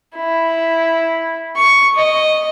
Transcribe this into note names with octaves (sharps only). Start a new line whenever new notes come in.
E4
C#6
D#5